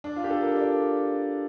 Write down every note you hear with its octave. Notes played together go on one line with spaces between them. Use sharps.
D4
F4
G4
A4
A#4
D5